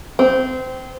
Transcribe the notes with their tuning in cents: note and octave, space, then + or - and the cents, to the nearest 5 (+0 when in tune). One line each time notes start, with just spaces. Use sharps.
C4 -20